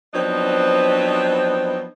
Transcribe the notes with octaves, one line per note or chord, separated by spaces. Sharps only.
F3 F#3 B3 C4 D4 D#4